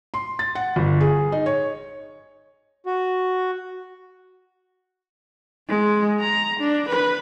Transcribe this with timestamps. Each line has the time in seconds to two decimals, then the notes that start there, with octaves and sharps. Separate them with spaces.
0.14 C6
0.39 A6
0.55 F#5
0.76 G1
1.01 G#4
1.32 D#4
1.46 C#5
2.86 F#4
5.68 G#3
6.20 A#5
6.59 D4
6.88 B4